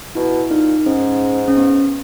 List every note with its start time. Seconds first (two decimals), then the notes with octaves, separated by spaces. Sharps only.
0.15 B2 E4
0.50 A#2 D#4
0.86 G#2 C#4
1.48 C#4
1.57 B3